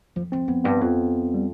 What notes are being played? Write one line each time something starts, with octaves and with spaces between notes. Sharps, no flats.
F2 F3
F2 C4
F2 B3
G2 B3
F2
G3